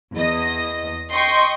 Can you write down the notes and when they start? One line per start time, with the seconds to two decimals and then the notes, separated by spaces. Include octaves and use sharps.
0.15 E2 D#5
1.14 D#5 G5 C6 C#6